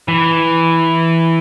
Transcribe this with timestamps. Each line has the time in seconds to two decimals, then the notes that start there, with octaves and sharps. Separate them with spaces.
0.08 E3